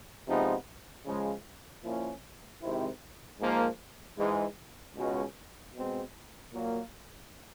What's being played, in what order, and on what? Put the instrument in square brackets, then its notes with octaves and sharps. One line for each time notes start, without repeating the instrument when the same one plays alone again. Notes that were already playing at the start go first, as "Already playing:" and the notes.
[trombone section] C3 F3 G#3 B3 D#4
C#3 F3 G#3
A#2 F3 A#3 C#4 E4
C3 D#3 G#3 C4 E4
G#2 F3 A#3
G#2 E3 G#3
C#2 B2 G#3 C#4 F#4
B2 G#3 C4
A#2 F#3 A#3